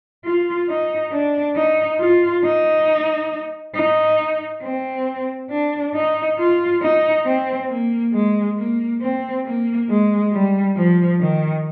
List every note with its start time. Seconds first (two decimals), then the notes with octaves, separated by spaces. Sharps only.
0.24 F4
0.69 D#4
1.12 D4
1.56 D#4
2.00 F4
2.44 D#4
3.75 D#4
4.63 C4
5.50 D4
5.94 D#4
6.39 F4
6.82 D#4
7.26 C4
7.69 A#3
8.13 G#3
8.58 A#3
9.01 C4
9.46 A#3
9.89 G#3
10.33 G3
10.76 F3
11.20 D#3